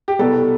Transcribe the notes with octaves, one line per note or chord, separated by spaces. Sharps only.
G4
C2 B2 G3 B3 A4